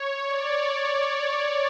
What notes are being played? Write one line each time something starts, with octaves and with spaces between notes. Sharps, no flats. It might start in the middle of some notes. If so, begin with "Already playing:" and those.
Already playing: C#5
D5